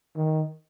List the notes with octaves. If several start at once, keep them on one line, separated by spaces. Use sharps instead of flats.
D#3